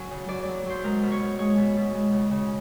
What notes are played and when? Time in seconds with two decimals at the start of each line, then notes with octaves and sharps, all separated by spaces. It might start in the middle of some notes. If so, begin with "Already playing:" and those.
Already playing: F#3 G#5
0.10 C#3
0.28 F#3 D5
0.42 D5
0.48 F#3
0.65 F#3 C5
0.83 G#3 A#4
1.03 B2
1.12 C#5
1.20 B2
1.39 G#3 C#5
1.57 B2
1.76 B2
1.95 G#3
2.12 C#3
2.31 C#3